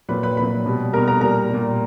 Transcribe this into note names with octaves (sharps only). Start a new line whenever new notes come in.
A#2 F#3 B4 B5
B4 B5
A#2 F#3 B4 B5
B2 G3
B2 G3 A#4 A#5
A#4 A#5
A#2 G3 A#4 A#5
A#2 G3